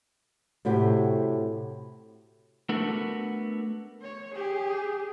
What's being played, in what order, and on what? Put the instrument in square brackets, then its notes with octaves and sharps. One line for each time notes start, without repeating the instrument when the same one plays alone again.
[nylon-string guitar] A2 C3 F#4 G4
[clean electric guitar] A3 B3 D4 F#4 A4 A#4
[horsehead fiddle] C#5
G4 G#4